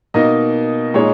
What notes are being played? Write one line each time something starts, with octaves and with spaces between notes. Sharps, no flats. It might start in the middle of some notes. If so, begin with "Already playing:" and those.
B2 A#3 D#4 D#5
A#2 G#3 D#4 C#5